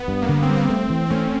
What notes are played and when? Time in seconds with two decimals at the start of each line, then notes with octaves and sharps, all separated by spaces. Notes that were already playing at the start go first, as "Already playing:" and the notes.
Already playing: B3
0.08 G2
0.22 A#3
0.29 D3 B3
0.42 C4
0.49 G3
0.56 C4
0.69 A3 C4
0.90 E3
1.06 C4
1.10 A3 C#4